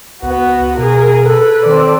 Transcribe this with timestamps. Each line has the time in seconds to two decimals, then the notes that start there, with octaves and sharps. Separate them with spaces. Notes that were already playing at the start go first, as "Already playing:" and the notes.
0.23 C#2 B3 F#4
0.78 B2 G#4 A#4
1.25 A4 B4
1.65 D#3 C4 D5